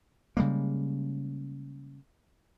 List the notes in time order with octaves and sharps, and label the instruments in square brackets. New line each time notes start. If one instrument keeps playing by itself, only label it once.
[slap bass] C#3 G3 G#3 A#3